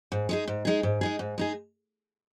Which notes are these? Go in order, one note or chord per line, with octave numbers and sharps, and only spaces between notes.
G#2
G#3 D#4 G#4
G#2
G#3 D#4 G#4
G#2
G#3 D#4 G#4
G#2
G#3 D#4 G#4